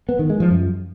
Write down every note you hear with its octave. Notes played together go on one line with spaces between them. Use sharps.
B3
D#3
G#3
F3
F#2